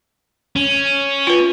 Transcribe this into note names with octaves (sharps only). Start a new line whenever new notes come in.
C#4
F4 B4